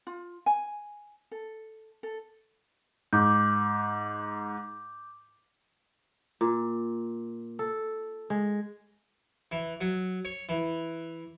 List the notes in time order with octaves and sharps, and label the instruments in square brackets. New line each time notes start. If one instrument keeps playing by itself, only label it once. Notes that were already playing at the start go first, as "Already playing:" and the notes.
[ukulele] F4
G#5
A4
A4
[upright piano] G#2 [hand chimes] D6 G6
[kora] A#2
A4
G#3
[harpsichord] E3
F#3
C#5
E3